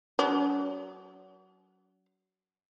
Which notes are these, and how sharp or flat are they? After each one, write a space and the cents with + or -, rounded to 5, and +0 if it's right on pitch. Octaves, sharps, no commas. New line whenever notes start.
F#3 +15 C#4 +40